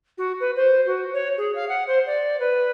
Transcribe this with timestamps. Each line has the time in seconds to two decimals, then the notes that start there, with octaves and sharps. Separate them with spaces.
0.18 F#4
0.40 B4
0.56 C5
0.86 F#4
1.13 C#5
1.37 G#4
1.55 F5
1.68 F#5
1.87 C5
2.06 D5
2.39 B4